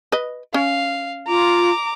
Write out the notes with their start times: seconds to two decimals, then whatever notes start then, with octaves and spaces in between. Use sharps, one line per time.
0.12 B4 D#5
0.54 C#4 F5
1.27 F4 A#5 D6